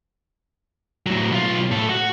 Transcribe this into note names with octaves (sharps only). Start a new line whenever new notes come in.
A2 F#3
B1 F4
A2 A4
F#4